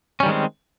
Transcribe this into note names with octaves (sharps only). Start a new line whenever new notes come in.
D#3 G3 G#3 C4 C#4